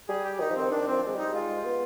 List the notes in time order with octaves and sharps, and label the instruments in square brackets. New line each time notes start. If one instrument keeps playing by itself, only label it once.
[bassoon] G3 [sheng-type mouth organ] G#4
[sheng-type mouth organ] G4
[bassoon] D#3 [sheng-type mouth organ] D#4
[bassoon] F3
[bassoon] D#3 [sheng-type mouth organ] C4
[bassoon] D#3 [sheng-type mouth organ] D4
[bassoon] F3 [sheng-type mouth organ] C4
[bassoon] G#3
[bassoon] G3 [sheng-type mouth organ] D#4
[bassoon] G#3 [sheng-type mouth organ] F4
[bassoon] B3